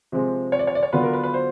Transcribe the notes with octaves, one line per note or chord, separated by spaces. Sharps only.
C3 F3 G#3 C4
C#5
D5
C#5
D5
C#5
D3 F#3 B3 D4 F4 B4
A#4
B4
B4
C5